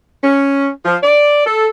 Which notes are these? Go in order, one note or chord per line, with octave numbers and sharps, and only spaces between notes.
C#4
F3
D5
A4